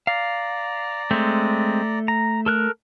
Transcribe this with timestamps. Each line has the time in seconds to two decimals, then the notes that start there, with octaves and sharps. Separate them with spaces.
0.07 D5 F5 A#5
1.11 G#3 A3 C4
2.08 A#5
2.46 A4 A#4 F#6